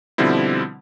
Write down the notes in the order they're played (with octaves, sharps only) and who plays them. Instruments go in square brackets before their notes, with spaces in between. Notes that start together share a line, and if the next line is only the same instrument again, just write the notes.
[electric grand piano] B2 D3 F3 G3 C4 E4